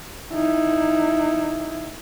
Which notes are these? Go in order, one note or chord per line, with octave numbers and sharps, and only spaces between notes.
D#4 E4